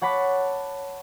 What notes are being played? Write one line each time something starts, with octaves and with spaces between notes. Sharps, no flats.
C#5 F#5 A5 B5 D6